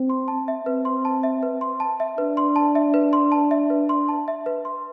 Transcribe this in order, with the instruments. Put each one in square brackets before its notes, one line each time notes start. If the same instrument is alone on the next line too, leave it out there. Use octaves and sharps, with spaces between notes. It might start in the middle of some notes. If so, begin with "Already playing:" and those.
Already playing: [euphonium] C4
[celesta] C6
A5
E5
[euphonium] C4 [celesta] B4
[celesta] C6
A5
E5
B4
C6
A5
E5
[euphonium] D4 [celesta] B4
[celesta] C6
A5
E5
B4
C6
A5
E5
B4
C6
A5
E5
B4
C6